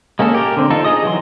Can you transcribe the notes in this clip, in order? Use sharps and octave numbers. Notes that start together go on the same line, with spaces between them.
G#3 A#3 C#4 A4
G4 A#4
D3 C4
D#4 F4 A4
D#4 G#4 D#5 D#6
E3 F#3 C6